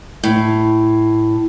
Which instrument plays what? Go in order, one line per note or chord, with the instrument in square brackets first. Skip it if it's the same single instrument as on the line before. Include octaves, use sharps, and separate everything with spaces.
[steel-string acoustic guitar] A2